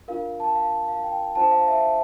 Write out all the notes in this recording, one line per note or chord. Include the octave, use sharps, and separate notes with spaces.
D4 F4 A#4 F5
A5
F5
F5
G5
D4 F4 C5 A5
F5
E5